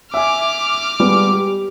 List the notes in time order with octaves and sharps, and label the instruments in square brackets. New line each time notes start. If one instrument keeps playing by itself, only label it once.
[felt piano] E5 G#5 [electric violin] D6 F6
[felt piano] G3 G#3 B3
G4